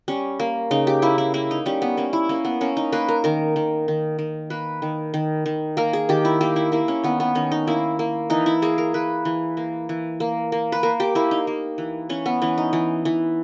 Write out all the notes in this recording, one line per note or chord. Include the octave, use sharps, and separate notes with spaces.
G3 C#4
A#3
C#3 D#4
G4
A#3 E4
E4
A#3 E4
D#4
G3 C#4
B3
A#3 C#4
E4
A#3 C#4
B3
A#3 C#4
D#4
A#3 B4
A#4
D#3 A#4
D#3
D#3
D#3
A#3 B4
D#3
D#3
D#3
A#3 A#4
G#4
D#3 G4
E4
A#3 G4
E4
A#3 E4
C#4
D#3 B3
B3
D#3 C#4
D#4
A#3 E4
A#3
E3 D#4
E4
A#3 G#4
A#4
A#3 B4
E3
A#3
E3
A#3
A#3
B4
A#3 A#4
G4
A#3 E4
D#4
A#3
E3
E3 C#4
B3
E3 C#4
D#4
E3
E3